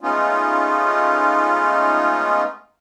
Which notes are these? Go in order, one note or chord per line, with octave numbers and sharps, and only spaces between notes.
G#3 A3 B3 C#4 D#4 F4